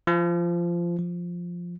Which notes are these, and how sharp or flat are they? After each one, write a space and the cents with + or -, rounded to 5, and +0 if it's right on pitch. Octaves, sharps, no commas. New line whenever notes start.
F3 -20
F3 +0